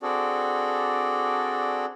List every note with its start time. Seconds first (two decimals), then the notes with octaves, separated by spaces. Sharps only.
0.03 C4 D4 F#4 G#4 A4 D5